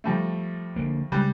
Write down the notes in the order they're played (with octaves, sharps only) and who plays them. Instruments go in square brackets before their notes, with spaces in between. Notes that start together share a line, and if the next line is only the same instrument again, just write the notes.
[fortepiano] F2 G3 A3
[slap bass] D3 A#3
[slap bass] C#3 G#3 [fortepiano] G3 F#6